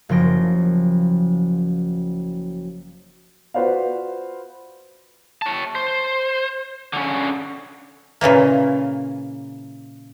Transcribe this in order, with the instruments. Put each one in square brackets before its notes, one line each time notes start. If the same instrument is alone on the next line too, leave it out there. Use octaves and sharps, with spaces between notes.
[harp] F#1 F3 C#4 C6 A#6 D7
[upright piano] F4 F#4 B4 C5 D5 F5
[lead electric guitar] C#5 A5
C5
D3 C#4
[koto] A#2 C#3 E3 A#3